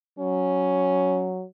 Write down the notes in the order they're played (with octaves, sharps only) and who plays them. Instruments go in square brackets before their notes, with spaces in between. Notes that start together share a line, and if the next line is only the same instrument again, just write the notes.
[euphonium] F#3 [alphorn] C#4